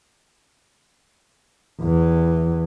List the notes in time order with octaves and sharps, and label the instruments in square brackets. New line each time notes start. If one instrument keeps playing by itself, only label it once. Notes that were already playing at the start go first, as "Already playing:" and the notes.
[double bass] E2 E3